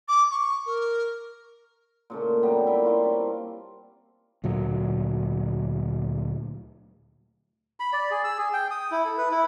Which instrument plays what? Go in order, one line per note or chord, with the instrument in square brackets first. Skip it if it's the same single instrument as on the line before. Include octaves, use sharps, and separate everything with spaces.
[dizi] D6
C#6
A#4
[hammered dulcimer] A#2 C#3 A3
F#3 G3 B3 G4
A#3 E4 E5 G5
C4 F4 C#6
G3 D4
[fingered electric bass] D2 A#2 F#3
[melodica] B5
D5
G#4
E6
G#4
G5
D#6
E4
A4
B4
E4